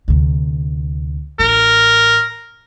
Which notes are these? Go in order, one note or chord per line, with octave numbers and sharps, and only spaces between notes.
D2 C3
A1 A#4